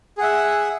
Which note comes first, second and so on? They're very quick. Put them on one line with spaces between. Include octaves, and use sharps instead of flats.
G#4 F#5 E5